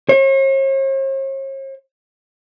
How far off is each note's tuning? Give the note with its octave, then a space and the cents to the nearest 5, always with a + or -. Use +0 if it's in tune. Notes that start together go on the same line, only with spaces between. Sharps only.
C#5 -45